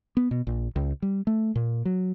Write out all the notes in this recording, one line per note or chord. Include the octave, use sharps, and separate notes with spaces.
B3
B2
A#1
C#2
G3
A3
A#2
F#3